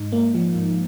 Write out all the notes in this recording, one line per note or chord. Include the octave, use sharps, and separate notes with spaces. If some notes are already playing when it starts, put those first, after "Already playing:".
Already playing: G#2 D#4
A#3
F3
G#2